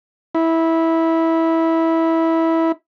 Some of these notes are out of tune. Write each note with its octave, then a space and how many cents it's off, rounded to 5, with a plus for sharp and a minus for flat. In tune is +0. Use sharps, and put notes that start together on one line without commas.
E4 -15